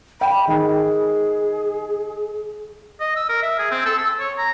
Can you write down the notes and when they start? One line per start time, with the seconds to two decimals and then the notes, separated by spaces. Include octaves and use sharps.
0.21 G5 B5
0.48 D#3 G#4
3.01 D#5
3.16 E6
3.29 A#4
3.43 E5
3.59 G#4
3.71 C4
3.85 A4
3.99 E6
4.20 C#5
4.38 A#5